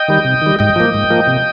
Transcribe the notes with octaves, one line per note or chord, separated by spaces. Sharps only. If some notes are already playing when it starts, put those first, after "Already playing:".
Already playing: D#5 G5
D#3 G3
C3
D#3 G3
G#2 D#5 G5
F3 A#3
G#2
F3 A#3
C3